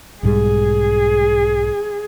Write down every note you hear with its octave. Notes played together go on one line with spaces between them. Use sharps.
B1 G#2 G3 G#4